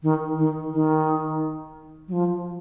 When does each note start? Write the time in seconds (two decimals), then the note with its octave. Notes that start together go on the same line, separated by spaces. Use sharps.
0.03 D#3
0.38 D#3
0.73 D#3
2.08 F#3
2.13 F3